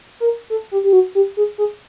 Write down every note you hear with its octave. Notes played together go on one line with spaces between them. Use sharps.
A#4
A4
G4
G4
F#4
G4
G#4
G#4